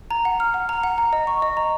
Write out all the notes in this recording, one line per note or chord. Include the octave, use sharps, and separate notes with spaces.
A#5
F#5
F6
F#5
A#5
F#5
A#5
D#5
C#6
D#5
A#5